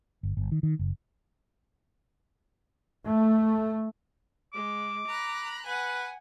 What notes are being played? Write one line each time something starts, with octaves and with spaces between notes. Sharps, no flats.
G1
G1
D#3
D#3
F#1
A3
G#3 D6
A#5 B5 F#6
B4 F#5 G#5